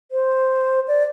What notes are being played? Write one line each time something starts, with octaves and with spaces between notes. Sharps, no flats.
C5
D5